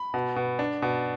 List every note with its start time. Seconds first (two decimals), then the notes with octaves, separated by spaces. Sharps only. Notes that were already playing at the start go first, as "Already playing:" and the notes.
Already playing: B5
0.14 B2
0.36 B2
0.59 D4
0.82 B2